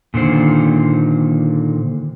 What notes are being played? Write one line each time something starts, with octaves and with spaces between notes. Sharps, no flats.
A#2 D3 D#3 C5